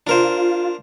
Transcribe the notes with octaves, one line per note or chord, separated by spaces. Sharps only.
D4 F4 A#4 C5